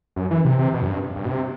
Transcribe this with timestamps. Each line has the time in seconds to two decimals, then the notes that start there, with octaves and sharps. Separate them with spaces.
0.16 F#2
0.31 E3
0.45 C3
0.59 C3
0.74 B2
0.82 F#2
0.88 G2
1.16 G2
1.25 B2
1.31 C3